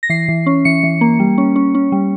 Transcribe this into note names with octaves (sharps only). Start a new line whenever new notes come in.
A#6
E3 C7
E3
C#4
E3 C#7
E3
A#3
G3
C#4
C#4
C#4
G3